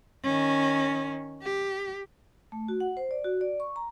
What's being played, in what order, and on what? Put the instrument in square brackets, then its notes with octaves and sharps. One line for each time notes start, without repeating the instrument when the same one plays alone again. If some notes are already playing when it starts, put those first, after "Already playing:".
[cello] D#3 C#4
G4
[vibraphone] A3
F#4
F#5
C5
D5
F#4
D5
C#6
A#5